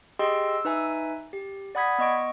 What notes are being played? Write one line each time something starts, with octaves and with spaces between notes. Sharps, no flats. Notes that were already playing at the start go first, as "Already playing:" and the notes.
G4 G#4 D#5 G5 C6 E6
E6
D#4 B4 E5 G#5
G4
D5 F#5 B5 D#6 G#6 B6
B3 D#5 C#6 D7